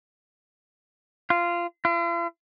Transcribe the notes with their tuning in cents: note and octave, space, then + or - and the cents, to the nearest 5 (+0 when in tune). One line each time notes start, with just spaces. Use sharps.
F4 -15
F4 -45